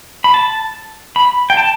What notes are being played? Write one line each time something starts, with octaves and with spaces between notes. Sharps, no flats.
B5
A5
B5
G5
A5